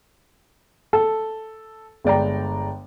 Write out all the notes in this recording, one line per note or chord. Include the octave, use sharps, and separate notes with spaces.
A4
G1 G#3 D5 G5 A#5